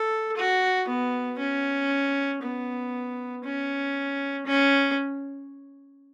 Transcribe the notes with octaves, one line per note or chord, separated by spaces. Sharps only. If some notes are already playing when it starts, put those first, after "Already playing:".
Already playing: A4
F#4
B3
C#4
B3
C#4
C#4